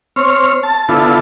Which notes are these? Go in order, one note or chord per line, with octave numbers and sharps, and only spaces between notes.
C4 C#5 F6
A5
D3 B3 E4 F4 A4